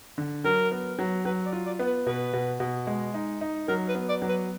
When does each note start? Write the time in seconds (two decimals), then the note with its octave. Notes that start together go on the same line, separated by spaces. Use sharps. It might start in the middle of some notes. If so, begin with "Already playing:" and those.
0.18 D3
0.44 F#3 A#4
0.71 B3
0.99 F#3
1.25 F#3 B4
1.46 D5
1.52 F4
1.66 D5
1.79 B3
1.86 B4
2.06 B2 B4
2.33 B2
2.60 B2
2.87 G#3
3.14 D#4
3.41 D#4
3.68 F#3 A#4
3.88 B4
3.95 B3
4.09 D5
4.22 F#3
4.29 B4